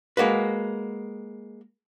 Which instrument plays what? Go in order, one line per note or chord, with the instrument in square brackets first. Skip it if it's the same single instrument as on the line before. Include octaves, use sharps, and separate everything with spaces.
[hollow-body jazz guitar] G#3 A#3 F#4 B4